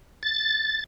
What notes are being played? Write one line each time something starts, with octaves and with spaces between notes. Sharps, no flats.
A6